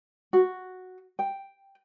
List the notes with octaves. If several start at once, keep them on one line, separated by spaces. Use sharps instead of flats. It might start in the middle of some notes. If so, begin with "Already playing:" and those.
F#4
G5